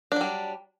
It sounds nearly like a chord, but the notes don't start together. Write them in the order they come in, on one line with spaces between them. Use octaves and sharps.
D4 F#3 G3